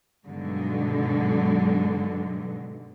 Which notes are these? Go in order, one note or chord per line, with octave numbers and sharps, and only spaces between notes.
G2 B2 D3 D#3 F#3 G#3